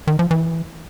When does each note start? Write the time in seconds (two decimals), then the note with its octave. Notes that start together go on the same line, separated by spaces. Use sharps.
0.07 D#3
0.19 F3
0.31 E3